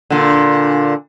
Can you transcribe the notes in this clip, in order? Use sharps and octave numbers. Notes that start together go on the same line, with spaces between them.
A#2 D3